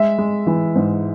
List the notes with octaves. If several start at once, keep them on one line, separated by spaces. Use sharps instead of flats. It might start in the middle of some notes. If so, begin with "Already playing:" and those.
Already playing: G#3 E5
G#3
E3
G#2